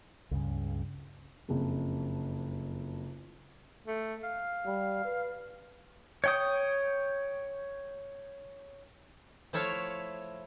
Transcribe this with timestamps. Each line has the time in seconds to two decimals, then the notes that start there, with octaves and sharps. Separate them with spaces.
0.31 C#2 G2 C#3
1.48 F#1 F2
3.87 A3
4.23 F5
4.66 G3
5.04 B4
6.24 C#5 G5 D#6
9.53 F3 A3 E4 C#5 F5